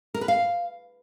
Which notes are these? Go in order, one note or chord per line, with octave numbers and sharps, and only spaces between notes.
A#4
B4
F5